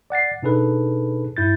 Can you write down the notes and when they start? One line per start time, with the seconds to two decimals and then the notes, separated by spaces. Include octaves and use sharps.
0.10 D5 F#5 A6 C7
0.42 B2 D4 D#4 G#4 A4 B4
1.36 G2 E4 G6 A6